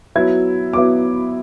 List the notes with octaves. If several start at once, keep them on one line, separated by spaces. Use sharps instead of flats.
F#3 B3 E4 G#6
F#3 B3 E4 D6